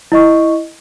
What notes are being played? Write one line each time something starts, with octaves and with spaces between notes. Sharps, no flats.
E4 D#5 C#6